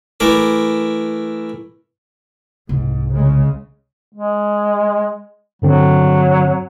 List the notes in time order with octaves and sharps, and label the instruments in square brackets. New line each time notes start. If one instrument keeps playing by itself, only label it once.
[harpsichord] E3 A3 A#4 D6
[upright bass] C2 [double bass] G#2
[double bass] C#3 G#3
[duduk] G#3
[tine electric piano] G2 D3 C4 [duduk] F#3